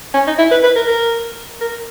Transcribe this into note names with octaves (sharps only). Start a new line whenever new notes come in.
C#4
D#4
E4
B4
B4
A#4
A#4
A#4